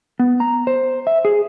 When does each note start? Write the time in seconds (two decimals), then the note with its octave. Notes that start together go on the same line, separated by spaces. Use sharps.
0.19 B3
0.40 A#5
0.67 C5
1.07 E5
1.25 G#4